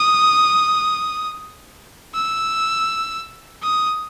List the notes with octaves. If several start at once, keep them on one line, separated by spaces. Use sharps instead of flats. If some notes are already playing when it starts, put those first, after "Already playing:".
Already playing: D#6
E6
D#6